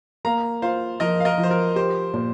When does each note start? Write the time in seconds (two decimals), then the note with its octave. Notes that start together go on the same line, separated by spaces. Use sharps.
0.25 A#3 F5 A#5
0.62 F4 C5 F5
1.00 F3 A#4 D#5
1.20 F5
1.25 A#4 D#5
1.38 F3
1.43 C5
1.51 A#4
1.75 G4 C5
2.14 A#2